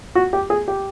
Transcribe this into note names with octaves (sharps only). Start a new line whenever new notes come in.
F#4
G4
G#4
G4